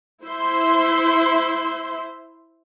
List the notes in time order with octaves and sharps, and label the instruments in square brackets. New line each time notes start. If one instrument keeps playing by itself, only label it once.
[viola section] E4 C5 E5 C6